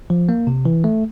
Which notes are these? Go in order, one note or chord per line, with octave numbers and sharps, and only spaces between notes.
F3
A#3
C3
E3
A3